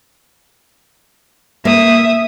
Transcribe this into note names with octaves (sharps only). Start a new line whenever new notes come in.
A#3 E5 D#6